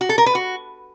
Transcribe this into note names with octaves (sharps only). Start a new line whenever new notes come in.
F#4
A4
A#4
B4
F#4